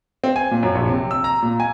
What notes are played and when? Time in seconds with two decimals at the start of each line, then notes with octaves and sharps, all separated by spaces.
0.24 C4
0.36 G#5
0.51 A#2
0.63 F#2
0.75 A#1
0.88 C3
1.11 E6
1.24 A#5
1.42 A#2
1.60 G#5